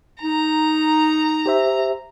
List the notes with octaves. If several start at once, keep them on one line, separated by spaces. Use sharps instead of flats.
D#4 A#5
G4 C5 E5